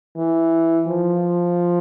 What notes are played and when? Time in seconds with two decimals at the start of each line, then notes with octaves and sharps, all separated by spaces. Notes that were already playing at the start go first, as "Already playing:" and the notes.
0.17 E3
0.87 F3